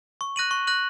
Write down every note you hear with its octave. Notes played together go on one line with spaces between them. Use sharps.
C#6
F#6 A#6 D#7 F#7
C#6
F#6 A#6 D#7 F#7